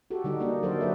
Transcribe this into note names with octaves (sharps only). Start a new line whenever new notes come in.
F#4 G4 A4
D3 G3 D#4 F#4
A#3 D4 D#4
F#3 A4 A#4 C5 D5
F#4 B4 E5